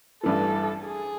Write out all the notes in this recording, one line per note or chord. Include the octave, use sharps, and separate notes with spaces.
A1 G2 E3 A4
G#4